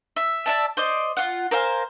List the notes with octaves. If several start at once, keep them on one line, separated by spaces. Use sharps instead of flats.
E5
D5 E5 A5
C5 D5 D#5
F4 F#5
A#4 C5 F5 G#5